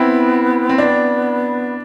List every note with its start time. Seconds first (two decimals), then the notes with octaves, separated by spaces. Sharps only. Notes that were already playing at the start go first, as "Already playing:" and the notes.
Already playing: B3 C4 E4
0.69 C4
0.78 B3 D4